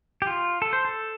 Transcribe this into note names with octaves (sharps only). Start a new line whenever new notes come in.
G4
F4
A4
C5
A4